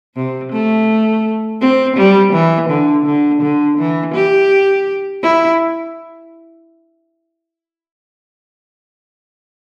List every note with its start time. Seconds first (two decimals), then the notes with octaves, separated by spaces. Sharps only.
0.16 C3
0.52 A3
1.61 C4
1.97 G3
2.33 E3
2.70 D3
3.06 D3
3.42 D3
3.78 E3
4.14 G4
5.23 E4